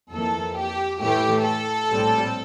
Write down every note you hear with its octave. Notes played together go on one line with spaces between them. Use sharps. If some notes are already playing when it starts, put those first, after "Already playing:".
F2 E3 A#3 A4
G4
A2 E3 A3 G4
A4
A#1 A2 G3 C4